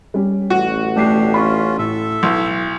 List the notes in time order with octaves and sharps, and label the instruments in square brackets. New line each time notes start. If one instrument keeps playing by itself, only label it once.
[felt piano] G3 C#4
[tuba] A1 [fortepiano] F#4
[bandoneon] B2 D4 G4 [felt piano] A3 C7
[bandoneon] C#4 F4 [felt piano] B5 C#6
[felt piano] A2 [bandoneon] A4 E5
[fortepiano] B1 [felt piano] E4